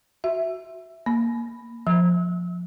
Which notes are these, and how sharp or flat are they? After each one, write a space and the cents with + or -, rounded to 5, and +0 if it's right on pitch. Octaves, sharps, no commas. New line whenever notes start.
F#4 +0 E5 +0
A#3 +0 B5 +0
F3 +15 E6 -35